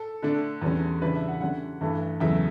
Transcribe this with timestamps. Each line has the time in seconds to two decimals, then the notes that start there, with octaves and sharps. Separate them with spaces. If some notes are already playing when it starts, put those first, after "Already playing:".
Already playing: A4
0.22 D3 A3 D4
0.62 E2 D3 G3 C#4
1.01 C#3 E3 G3 D4 B4
1.15 E5
1.28 F#5
1.41 D3 G3 C#4 F#5
1.81 G2 E3 A3
2.20 E2 C#3 F#3 A3 E5